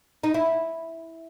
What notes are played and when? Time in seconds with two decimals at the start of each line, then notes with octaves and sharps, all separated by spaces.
0.24 D#4
0.34 E4